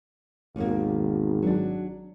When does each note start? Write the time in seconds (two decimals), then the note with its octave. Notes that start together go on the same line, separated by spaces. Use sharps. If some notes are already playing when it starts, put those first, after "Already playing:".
0.56 G#1 D#2 B2 A#3
1.42 F#3 D4